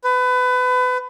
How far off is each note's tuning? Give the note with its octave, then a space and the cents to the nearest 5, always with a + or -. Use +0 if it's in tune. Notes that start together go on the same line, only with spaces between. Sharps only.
B4 +25